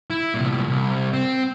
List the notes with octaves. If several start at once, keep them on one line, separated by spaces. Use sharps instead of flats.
E4
C2 A#2
C2
C4